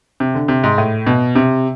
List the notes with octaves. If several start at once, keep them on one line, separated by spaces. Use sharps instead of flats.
C3
D3
C3
G#2
A2
B2
C3